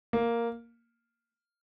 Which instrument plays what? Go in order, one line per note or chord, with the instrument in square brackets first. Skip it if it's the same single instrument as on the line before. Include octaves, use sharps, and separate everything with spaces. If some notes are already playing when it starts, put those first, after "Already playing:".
[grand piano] A#3